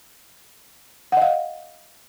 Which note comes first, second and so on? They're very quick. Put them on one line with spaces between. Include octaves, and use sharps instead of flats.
F#5 D#5 F5